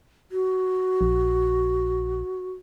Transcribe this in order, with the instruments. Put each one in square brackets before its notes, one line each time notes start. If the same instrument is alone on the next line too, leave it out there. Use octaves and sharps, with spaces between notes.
[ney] F#4
[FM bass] A#1